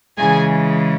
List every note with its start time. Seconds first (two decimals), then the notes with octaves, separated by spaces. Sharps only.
0.17 C#3 E3 G#3 G#4 G#5